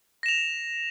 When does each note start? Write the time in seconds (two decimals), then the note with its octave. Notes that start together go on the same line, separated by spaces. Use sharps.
0.23 A#6
0.26 E7
0.28 F7